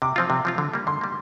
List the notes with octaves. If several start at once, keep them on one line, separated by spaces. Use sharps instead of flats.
C3 D6
F3 C4 F4
C3
F3 C4 F4
D3
G3 A#3
D3 C6
G3 A#3